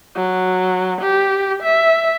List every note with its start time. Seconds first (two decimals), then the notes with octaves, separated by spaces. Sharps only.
0.15 F#3
1.01 G4
1.62 E5